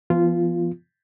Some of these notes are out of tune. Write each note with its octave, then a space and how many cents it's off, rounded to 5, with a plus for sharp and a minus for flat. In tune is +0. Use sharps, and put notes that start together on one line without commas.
F3 -40 B3 +0 F4 -10